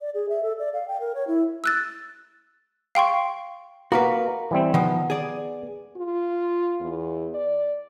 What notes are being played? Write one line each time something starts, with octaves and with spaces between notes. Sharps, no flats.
D5
G#4
E5
A4
D5
F5
G5
A#4
C#5
E4
E6 F#6 A6
F5 G5 C6 C#6
A#3 F#4 A#4 B4
E3 G3 C4
D#3 F3 B3
G#4 D5
F4
E2
D5